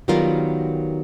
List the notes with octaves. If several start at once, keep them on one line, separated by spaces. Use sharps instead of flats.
D#3 F#3 G3 B3 F4 A#4